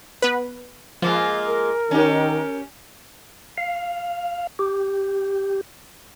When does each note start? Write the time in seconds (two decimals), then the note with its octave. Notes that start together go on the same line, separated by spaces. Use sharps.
0.22 B3 B4
1.02 F3 G#3 A#3 F4
1.47 A#4
1.91 D#3 C#4 G4
3.58 F5
4.59 G4